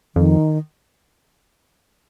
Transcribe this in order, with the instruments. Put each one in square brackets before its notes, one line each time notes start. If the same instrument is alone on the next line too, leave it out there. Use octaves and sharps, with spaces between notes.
[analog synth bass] F2 [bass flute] D#3